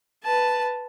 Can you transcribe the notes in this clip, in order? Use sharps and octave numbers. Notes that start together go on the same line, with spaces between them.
B4 A5